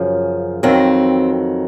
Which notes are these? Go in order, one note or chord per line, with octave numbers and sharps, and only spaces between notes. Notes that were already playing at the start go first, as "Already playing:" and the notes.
Already playing: F#2 C#3 F3
F2 D#3 F#3 C4